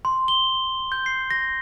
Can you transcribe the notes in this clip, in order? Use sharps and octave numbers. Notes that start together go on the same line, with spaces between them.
C6
G7
G6
C7
A#6